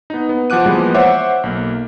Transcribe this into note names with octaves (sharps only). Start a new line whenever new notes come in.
B3 D#4
B3
F3 F#5 D6 F#6 D#7
E3 F3 G3 G#3 A#3 B3
C5 C#5 E5 F#5 D6
B1 A#3